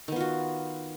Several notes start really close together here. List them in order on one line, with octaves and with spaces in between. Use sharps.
D#3 B3 F4 F#4